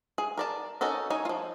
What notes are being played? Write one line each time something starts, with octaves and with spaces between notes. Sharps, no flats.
G#4
A#4 D5 A5
C#4 D#4 F#4 A4 A#4
D#4 C#5 G#5
F3 F4